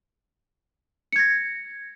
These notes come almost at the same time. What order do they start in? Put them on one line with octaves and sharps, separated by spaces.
C#7 G#6 A#6